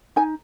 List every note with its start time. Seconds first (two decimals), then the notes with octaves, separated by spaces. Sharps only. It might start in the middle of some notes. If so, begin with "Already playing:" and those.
0.16 D#4 G#5